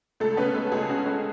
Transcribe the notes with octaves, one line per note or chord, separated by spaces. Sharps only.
C#2 A3 A4
B3 C#4 B4
G#3 A3 A4
C#2 G#3 G#4
C#4 F#4
C#4